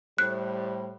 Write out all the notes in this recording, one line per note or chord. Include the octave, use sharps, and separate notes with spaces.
A2 G3 C5 F#6